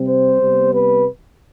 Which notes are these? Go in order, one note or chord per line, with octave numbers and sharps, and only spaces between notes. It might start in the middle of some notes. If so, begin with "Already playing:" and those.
Already playing: C3 G3 C4
C5
C3 G3 B3
B4